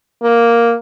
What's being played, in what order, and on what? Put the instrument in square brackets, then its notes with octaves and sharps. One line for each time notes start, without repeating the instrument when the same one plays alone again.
[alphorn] A#3